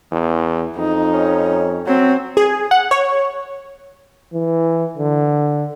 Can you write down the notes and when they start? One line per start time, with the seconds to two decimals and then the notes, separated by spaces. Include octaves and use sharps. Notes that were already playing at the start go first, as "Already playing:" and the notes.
0.12 E2
0.76 F2 D#4
1.13 C#4
1.87 F#3 C4
2.37 G#4
2.71 F#5
2.91 C#5
4.34 E3
4.98 D3